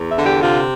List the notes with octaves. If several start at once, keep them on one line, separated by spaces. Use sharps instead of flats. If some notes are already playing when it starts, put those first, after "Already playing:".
Already playing: E2
E4
D3
G4
C3 F4